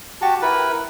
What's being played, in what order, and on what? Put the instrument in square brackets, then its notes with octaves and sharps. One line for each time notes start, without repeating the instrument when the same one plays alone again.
[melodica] F#4 G4 A5 C#6
E4 A#4 B4 B5